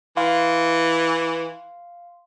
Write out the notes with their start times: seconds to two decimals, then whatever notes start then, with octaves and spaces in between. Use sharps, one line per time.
0.17 E3 F5 C6